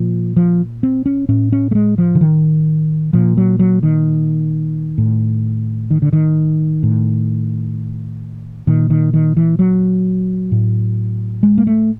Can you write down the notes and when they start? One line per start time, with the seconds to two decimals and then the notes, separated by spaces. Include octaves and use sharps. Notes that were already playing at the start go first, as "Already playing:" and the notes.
Already playing: A#2 F3
0.36 F3
0.83 C4
1.06 C#4
1.29 A2 C#4
1.52 C#4
1.71 A3
1.75 G#3
1.98 F3
2.15 D3
2.21 D#3
3.13 A#2 F3
3.37 F#3
3.59 F#3
3.83 D#3
4.98 A2
5.91 D#3
6.02 D3
6.13 D#3
6.83 A2
8.67 A#2 D#3
8.90 D#3
9.14 D#3
9.37 E3
9.59 F#3
10.52 A2
11.43 G#3
11.58 A#3
11.67 A3